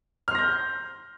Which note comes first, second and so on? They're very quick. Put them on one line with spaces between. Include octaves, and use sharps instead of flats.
F6 C6 A#6 G6